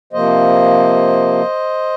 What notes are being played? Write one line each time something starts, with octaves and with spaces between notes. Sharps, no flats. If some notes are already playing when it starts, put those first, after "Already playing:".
C3 F3 A#3 C5 D#5